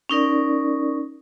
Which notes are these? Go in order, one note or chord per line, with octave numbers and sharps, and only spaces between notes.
C#4 D#4 A#4 D5